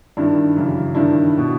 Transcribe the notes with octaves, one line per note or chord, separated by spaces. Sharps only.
G2 D#3 D4 E4
F#2 C#3 E3
G2 D#3 D4 E4
B2